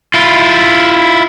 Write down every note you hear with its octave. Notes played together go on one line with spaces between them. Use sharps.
E4 F4